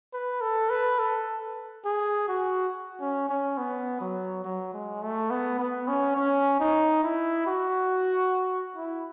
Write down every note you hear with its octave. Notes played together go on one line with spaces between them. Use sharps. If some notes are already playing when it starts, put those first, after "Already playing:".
B4
A4
B4
A4
G#4
F#4
C#4
C#4
B3
F#3
F#3
G#3
A3
B3
B3
C#4
C#4
D#4
E4
F#4
E4